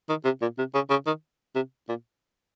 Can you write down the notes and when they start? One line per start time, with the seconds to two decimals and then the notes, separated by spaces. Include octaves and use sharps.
0.09 D#3
0.25 C3
0.42 A#2
0.58 C3
0.75 C#3
0.90 C#3
1.06 D#3
1.55 C3
1.89 A#2